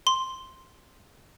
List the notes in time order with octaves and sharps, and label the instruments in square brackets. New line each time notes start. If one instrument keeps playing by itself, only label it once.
[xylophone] C6